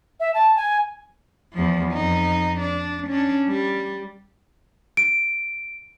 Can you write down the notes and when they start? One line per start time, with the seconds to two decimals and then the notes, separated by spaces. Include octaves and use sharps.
0.20 E5
0.34 A5
0.56 G#5
1.53 E2 F3
1.93 F2 D#4
2.60 D4
3.08 C#4 D4
3.49 G3
4.97 D7